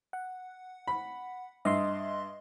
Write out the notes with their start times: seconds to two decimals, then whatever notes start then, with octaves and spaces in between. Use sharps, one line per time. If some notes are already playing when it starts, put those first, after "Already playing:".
0.13 F#5
0.87 B5
1.65 G2 D#5 E5 C6